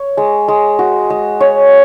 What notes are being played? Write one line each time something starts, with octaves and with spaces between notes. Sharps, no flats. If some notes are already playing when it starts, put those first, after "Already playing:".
Already playing: C#5
G#3
G#3
F#4
G#3
C#5